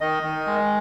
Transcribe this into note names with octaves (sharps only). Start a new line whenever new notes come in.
D#3 D#5
D#3
G#3